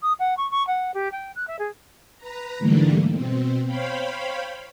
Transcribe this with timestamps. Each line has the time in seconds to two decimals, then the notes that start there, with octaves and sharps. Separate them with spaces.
0.02 D#6
0.19 F#5
0.37 C#6
0.51 C#6
0.67 F#5
0.94 G4
1.12 G5
1.35 F#6
1.47 E5
1.59 G#4
2.18 B4 A#5
2.59 G#2 D3 E3 G3 A3 A#3
3.10 B2 C4
3.65 C5 C#5 F5 G5 B5